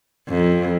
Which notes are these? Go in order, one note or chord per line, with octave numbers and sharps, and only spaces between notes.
F2